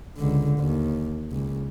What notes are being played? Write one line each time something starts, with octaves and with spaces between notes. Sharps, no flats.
C#2 D3
D#2
C#2